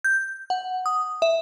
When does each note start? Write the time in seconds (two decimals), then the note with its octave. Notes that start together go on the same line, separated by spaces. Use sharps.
0.04 G6
0.50 F#5
0.86 D#6
1.22 E5